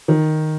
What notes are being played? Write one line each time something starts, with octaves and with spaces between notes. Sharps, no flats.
D#3